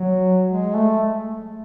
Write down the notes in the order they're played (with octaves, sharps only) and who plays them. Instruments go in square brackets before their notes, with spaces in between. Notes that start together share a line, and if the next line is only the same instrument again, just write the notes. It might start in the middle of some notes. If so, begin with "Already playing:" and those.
Already playing: [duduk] F#3
G#3
A3